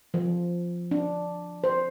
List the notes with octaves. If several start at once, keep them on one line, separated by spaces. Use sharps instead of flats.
F3
D4
C5